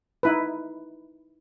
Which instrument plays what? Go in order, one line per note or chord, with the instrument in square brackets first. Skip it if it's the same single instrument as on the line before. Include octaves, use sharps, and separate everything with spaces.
[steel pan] D#4 E4 B4